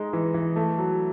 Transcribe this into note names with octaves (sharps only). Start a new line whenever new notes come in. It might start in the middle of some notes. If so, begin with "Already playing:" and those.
Already playing: G#3 D#4
E3
E3
A3
F#3